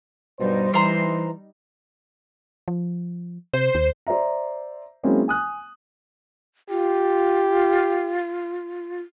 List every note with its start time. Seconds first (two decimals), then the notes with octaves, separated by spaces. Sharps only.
0.40 G2 B2 G3 D#4 C5
0.74 E3 C5 A#5 C6
2.68 F3
3.53 C3 C5
3.75 D#2
4.07 C5 D5 E5 A#5
5.03 F#3 G#3 A#3 C4 C#4 E4
5.28 G#5 D#6 F#6
6.69 F4 G4